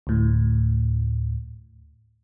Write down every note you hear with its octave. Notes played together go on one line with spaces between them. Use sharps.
D2 A2